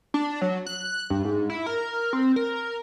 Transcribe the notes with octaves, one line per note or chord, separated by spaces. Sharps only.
D4
F#3
F#6
G2
G#2
E4
A#4
C4
A#4